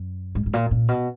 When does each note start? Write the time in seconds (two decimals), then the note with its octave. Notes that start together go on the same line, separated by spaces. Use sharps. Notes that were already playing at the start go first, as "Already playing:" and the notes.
Already playing: F#2
0.35 G#2
0.46 G#2
0.53 A#2
0.71 A#2
0.88 B2